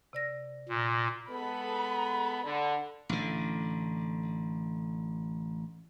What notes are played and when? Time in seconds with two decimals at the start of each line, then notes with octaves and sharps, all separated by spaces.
0.13 C3 D5 A#6
0.69 A#2
1.30 G#3 B3 A4 B5
2.43 D3
3.09 A1 D3